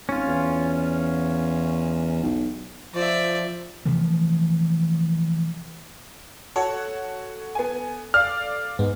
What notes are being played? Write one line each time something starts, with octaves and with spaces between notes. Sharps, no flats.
G#1 C#4 F4
E2
B1
F3 D5 E5
C3 E3 F3 A3
F#4 A4 C#5 F#5
B3 G#5
D5 F5 F6
G#2 B3